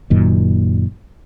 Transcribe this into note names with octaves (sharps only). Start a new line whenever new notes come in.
F#1 F#2 A#2 D#3